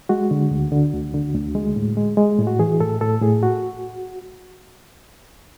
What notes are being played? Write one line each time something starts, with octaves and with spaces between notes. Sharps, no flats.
G#3 F#4
D3
D2
D3
D2
D3
D2
G#3
A2
G#3
G#3
A2
F#4
E3 G#4
A2 A4
A2 A4
A2 G#4
F#4